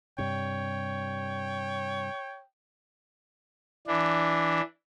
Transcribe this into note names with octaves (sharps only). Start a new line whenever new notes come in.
G2 C3 C#5 G5
E3 D4